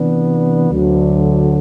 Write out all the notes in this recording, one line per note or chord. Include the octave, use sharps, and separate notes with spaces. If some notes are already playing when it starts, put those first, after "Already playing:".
Already playing: C3 E3 B3 D4
D2 D3 F#3